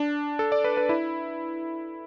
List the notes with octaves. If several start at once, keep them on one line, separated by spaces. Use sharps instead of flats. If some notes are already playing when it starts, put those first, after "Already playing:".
Already playing: D4
A4
D5
B4
B4
E4